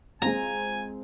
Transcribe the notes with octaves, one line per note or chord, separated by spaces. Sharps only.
G#3 C4 F4 G#5 A#5